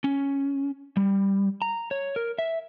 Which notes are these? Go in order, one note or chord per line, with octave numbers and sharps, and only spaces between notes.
C#4
G3
A#5
C#5
A#4
E5